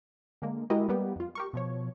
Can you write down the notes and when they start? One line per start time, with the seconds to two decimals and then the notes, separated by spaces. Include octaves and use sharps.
0.42 D3 G#3 A#3
0.70 G#3 E4 F#4 G4 A#4 D#5
0.88 G3 A#3 B3 G4
1.16 F2 F4
1.35 G4 A#4 C#6
1.53 B2 F3 C#5